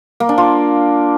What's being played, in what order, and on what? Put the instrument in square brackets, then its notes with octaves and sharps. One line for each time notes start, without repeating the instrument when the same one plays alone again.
[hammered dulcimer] A#3
D4
F4